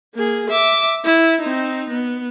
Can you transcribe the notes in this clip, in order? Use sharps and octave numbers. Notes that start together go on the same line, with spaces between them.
A#3 G#4
E5 D6
E4
C4 D#4
B3